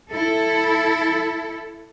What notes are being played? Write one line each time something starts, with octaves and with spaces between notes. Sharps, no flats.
E4 A4